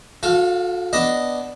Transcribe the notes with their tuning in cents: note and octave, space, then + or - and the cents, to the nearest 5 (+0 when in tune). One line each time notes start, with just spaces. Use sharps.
F#4 -45 A4 -15 F5 +0
B3 +0 D4 +0 D#5 +0